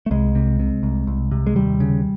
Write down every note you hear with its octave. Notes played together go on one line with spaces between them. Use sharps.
A3
C2 G#3
C3
C3
C2
C2
C3
G#3
D#2 G3
C#3